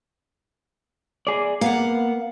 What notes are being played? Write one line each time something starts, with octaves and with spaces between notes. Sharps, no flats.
G#4 D5
A#3 B3 F5 F#5